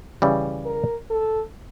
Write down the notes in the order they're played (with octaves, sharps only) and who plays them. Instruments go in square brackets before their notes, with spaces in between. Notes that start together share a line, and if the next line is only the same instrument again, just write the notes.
[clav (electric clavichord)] C#3 E3 G3
[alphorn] A#4
A4